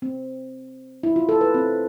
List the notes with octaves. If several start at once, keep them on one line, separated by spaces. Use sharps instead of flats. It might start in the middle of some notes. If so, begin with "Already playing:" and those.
C4
E4
F4
A4
B4
C4